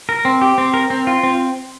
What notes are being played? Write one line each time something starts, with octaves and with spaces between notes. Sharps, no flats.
A#4
C4
G4
C4
A#4
C4
F4
C4